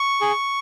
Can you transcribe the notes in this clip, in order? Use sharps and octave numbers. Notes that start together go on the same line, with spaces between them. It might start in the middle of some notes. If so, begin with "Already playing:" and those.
Already playing: C#6
G#4